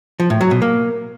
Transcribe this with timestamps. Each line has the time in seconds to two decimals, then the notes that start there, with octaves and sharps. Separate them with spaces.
0.20 F3
0.30 A2
0.41 F#3
0.51 B2
0.62 A#3